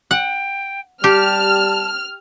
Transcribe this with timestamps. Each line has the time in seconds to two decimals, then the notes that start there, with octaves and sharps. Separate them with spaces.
0.11 F#5 G5
1.04 G3 G4 A5 F6